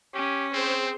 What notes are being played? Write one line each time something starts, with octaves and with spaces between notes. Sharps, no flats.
C#4 G4
C4 G#4 C5